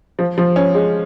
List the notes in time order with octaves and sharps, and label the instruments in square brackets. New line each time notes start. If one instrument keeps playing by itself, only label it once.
[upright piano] F3
F3
C#4
G#3